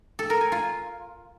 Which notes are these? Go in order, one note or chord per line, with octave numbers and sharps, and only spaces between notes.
A4
A#4
G#5
F4